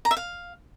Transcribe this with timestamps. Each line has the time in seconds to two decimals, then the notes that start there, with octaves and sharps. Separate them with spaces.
0.05 A#5
0.11 E5
0.17 F5